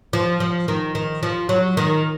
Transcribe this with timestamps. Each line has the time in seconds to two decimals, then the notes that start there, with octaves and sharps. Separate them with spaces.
0.13 F3
0.40 F3
0.68 D#3
0.95 D#3
1.23 F3
1.49 F#3
1.77 D#3